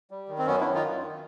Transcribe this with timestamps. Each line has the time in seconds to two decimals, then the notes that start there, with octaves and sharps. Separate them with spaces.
0.11 G3
0.28 D#3
0.38 C4
0.46 F#2 B3 C#4
0.60 D#3 D4 E4
0.75 D#4 F4
0.84 F#2
1.03 D#3